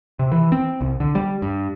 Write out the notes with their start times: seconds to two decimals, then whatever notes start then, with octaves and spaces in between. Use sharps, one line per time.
0.19 C3
0.32 E3
0.52 C4
0.81 C2
1.00 D3
1.15 G3
1.42 G2